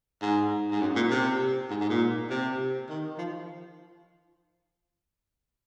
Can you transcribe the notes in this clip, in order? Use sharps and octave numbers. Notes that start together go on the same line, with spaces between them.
G#2
G#2
F#2
A#2
C3
G#2
G#2
A#2
C3
D#3
F3